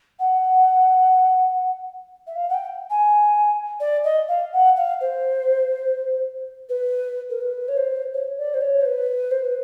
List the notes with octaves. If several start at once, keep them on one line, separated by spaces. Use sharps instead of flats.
F#5
E5
F5
F#5
G5
G#5
D5
D#5
F5
F#5
F5
C5
B4
A#4
B4
C#5
C5
C#5
D5
C5
C#5
C5
B4
C5
B4